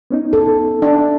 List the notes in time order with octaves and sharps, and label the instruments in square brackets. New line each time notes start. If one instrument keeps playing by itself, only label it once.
[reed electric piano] B3 C#4 D#4
[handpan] A4
[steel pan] D4